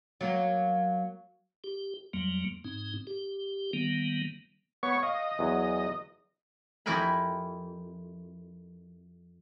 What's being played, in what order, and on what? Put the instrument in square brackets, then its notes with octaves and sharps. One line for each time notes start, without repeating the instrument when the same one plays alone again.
[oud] F#3 A#3
[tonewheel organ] G4
F2 F#3 G3 A#3
G#2 C4 D#4
G4
D#3 G3 A#3 B3
[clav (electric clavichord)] B3 [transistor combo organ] C#5 C#6
[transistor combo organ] D#5 [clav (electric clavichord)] F5
[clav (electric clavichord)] E2 F#3
[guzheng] F2 E4 G4 A#4 G#5 B5